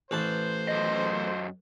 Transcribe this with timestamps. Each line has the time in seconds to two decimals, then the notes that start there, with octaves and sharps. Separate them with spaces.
0.11 A1 B4 C5 A5
0.68 F#2 F#3 D#5